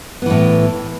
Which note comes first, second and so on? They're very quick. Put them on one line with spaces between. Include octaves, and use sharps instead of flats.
B3 E3 A2